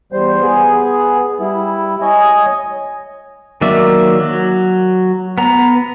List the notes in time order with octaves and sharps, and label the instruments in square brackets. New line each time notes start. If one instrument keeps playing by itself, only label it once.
[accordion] E2 G3 C5
B3 G#4
G3 E4
C#5 D#5 G#5
[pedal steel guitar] D#3 F#3 A#3 D5 E5
F#3
B3 A#5